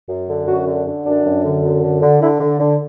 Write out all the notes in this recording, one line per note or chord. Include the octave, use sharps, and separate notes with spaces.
F#2
D3
F#2 F#4
D3
D3
F#2 D4
F#2
D3
F#2
D3
D3
D3 E4
D3
D3